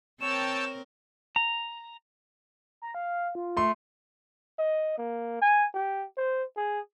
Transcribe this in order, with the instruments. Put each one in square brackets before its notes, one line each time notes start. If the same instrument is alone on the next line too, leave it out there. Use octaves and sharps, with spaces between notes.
[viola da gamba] C4 A#4 [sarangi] C#5 [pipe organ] G5 A5 E6 [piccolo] E7
[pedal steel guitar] A#5
[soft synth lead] A#5
F5
F4
[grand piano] A3 C6
[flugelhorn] D#5
A#3
G#5
G4
C5
G#4